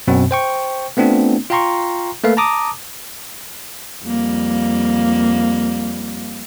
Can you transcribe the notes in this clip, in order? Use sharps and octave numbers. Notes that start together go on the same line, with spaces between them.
F#2 B2 C4
C5 G5 C#6
A3 B3 C4 D4 F4
F4 F5 G5 A#5 C6 C#6
A3 A#3 A4 B4 F5
A5 A#5 D6 D#6
F2 G3 A#3